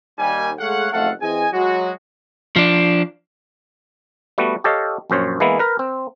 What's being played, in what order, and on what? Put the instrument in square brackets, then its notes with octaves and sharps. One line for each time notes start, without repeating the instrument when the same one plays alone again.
[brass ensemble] D#2 D#3 G3 G#5
G#3 A3 A4 C#5 F5 F#5
F#1 F2 A3 A4 F5 F#5
E3 C4 G#4 D#5 G#5
F#3 G#3 F#4
[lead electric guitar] F3 D4
[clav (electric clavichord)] G3 A3 B3 F#4
G4 A4 C#5 D#5 F5
A#1 F#2 C5 C#5
E3 G#3 A#3 B3 E4
A#4 B4
C4